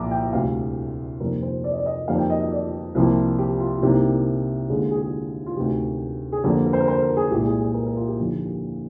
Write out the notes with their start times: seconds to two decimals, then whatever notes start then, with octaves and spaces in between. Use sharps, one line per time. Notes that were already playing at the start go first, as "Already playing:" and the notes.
Already playing: C2 A#2 F3 A#5 D6
0.11 G5
0.33 D2 C3 G3 F5
1.20 F2 C3 D#3 G3 A#3 A#4
1.42 C5
1.64 D5
1.71 D#5
1.78 D5
1.86 D#5
2.07 F2 D#3 G3 A#3 F5
2.18 G5
2.30 D#5
2.41 D#5
2.52 D5
2.95 C2 C3 F3 A#3
3.39 G4
3.60 F4
3.82 C2 C3 D#3 G3 A#3 G4
4.69 D#2 D3 G#3 G#4
4.81 G4
4.91 G#4
4.97 G4
5.02 G#4
5.46 F4
5.56 D2 C3 D#3 G4
6.32 G#4
6.44 F2 D3 G3 A#3 G4
6.66 A#4
6.73 C5
6.80 A#4
6.88 C5
7.02 A#4
7.17 G#4
7.31 C2 A#2 G#3 G4
7.46 G#4
7.60 G#4
7.74 A#4
7.86 A#4
7.96 F4
8.08 G4
8.19 D#2 D3 F3 A#3